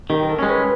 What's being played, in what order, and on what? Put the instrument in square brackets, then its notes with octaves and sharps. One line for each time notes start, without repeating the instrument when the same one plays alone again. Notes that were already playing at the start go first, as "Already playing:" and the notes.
[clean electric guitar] D#3 [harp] G4
[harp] A#4
A4
[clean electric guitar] G#3 C#4
[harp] B4